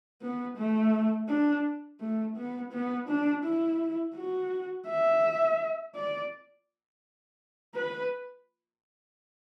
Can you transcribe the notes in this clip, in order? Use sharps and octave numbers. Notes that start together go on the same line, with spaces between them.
B3
A3
D4
A3
B3
B3
D4
E4
F#4
E5
D5
B4